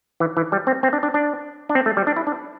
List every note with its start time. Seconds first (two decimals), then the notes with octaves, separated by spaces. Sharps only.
0.20 E3
0.37 E3
0.52 G3
0.67 C4
0.83 C4
0.93 D4
1.03 D4
1.14 D4
1.69 D4
1.75 C4
1.86 A3
1.97 G3
2.07 D4
2.16 E4
2.27 D4